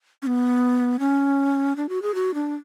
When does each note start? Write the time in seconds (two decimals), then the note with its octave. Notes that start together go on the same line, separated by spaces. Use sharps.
0.22 C#4
0.27 B3
0.99 C#4
1.76 D4
1.89 F#4
2.02 G#4
2.15 F#4
2.34 D4